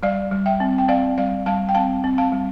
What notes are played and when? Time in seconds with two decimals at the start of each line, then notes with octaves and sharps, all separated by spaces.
0.03 G3 D5 F5
0.31 G3
0.46 E5 G5
0.60 C4
0.78 G5
0.88 C4 D5 F5
1.18 G3 D5 F5
1.46 G3 F5 A5
1.69 G5
1.75 C4 F5 A5
2.04 C4
2.18 F5 A5
2.32 G3